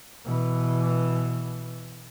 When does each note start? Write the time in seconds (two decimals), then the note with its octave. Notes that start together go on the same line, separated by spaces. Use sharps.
0.25 B2 E3